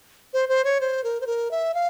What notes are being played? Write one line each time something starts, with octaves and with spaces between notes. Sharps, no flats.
C5
C5
C#5
C5
A#4
C5
A#4
E5
F5